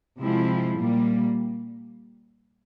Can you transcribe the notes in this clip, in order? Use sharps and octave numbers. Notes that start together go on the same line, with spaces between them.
C3 F3 G#3 C4 E4
A#2 G3 A#3